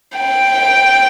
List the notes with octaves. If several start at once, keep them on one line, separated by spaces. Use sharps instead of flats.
G5